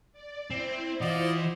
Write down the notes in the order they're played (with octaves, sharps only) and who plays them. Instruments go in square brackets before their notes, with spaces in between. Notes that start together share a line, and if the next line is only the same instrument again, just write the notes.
[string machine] D5
[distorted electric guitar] C4 [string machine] E4 C5
[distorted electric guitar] E3 F#5 [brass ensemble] F4 D5 D#5